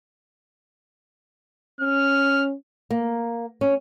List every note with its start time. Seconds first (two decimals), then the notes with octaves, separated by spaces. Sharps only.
1.81 C#4 F6
2.91 A#3
3.61 C#4